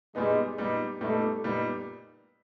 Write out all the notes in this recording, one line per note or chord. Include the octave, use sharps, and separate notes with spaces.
A#2 G3 G#3 B3 D#4
A#2 G3 B3 D#4
A#2 G3 A3 B3 D#4
A#2 G3 B3 D#4